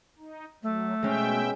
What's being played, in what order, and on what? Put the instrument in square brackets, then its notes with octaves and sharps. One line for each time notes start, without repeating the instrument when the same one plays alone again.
[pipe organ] D#4
[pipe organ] F#3 [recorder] A3
[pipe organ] B2 E5 G5 [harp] G#3 C#4